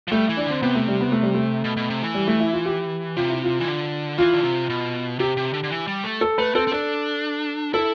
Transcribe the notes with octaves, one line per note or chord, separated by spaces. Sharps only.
F3
G3 A3
E3
D4
D3 C4
C3 B3
A3
G3
B3
A3
G3
A3
B2
B2
C3
E3
G3
A3
E4
F4
G4
C3 F4
E4
F4
E3
D3
E3 F4
D3
C3
B2
C3 G4
C3
D3
D3
E3
G3
A3
A4
A3 B4
C4 A4
C4
D4 A4
E4 A4